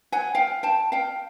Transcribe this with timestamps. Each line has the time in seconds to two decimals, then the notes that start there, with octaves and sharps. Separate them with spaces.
0.12 F#5 G#5
0.35 F5 G5
0.63 G5 A5
0.92 F5 G5